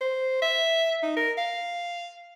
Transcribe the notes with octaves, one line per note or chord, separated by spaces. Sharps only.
C5
E5
D#4
A#4
F5